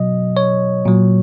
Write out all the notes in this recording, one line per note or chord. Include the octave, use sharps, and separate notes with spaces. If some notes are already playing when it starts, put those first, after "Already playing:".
Already playing: B2 F#3 D#5
C#5
A#2 F#3